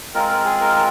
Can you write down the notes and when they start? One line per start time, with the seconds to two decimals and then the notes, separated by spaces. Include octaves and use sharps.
0.14 G#3 C4 F4 A#4
0.30 A#4
0.45 G#4
0.61 A#4
0.75 A#4